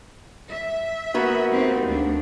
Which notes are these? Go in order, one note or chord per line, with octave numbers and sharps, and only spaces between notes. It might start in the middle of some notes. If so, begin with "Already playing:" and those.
E5
A#3 B3 F#4
C4 D#4 G4
D2 D4